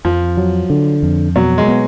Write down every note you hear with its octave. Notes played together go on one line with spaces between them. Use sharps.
F2 F3
F#3
D3
F2
B2 F#3
G#3
B3